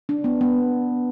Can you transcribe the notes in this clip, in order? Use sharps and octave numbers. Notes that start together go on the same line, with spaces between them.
D4
B3
B3